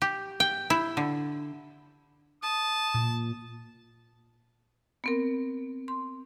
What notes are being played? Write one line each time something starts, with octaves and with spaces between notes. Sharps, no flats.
G4
G5
E4
D3
A5 D#6
A#2
B3 C4 A#4
C6